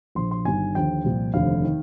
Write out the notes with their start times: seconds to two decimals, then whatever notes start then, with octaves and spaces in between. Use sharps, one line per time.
0.15 A#1 A#2 F3 C6
0.31 C6
0.45 G1 G2 D#3 G#5
0.75 D#2 D3 F3 G5
1.04 C2 A#2 F3
1.34 F1 D#2 D3 F3 F5
1.64 D#3